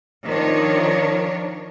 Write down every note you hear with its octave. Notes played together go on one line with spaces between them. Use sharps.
D#3 F3 D4 A#4 C#5